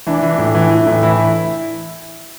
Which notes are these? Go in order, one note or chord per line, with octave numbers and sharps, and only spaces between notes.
E3 D4
E3
A2
E3
E3
A2
E3 E4